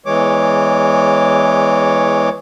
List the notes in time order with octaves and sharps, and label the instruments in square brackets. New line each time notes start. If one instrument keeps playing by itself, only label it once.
[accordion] E2 E3 G#3 C#5 D6